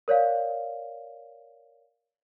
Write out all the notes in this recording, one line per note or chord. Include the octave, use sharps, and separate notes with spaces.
A#4 C#5 D5 F5